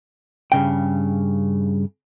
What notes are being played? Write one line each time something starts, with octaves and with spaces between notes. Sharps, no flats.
G2 C#3 G5